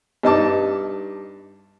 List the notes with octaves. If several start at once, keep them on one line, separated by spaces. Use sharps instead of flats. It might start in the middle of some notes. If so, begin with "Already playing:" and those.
G2 D#4 A5 D6